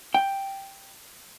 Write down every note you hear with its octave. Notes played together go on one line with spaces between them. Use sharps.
G5